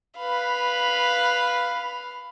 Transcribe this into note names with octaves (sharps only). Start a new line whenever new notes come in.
B4 F5 B5